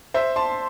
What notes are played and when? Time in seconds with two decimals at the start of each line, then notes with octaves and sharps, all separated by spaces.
0.14 C5 E5
0.36 A5 C6